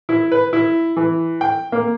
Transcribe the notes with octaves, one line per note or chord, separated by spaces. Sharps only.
E4
B4
E4
E3
G5
A#3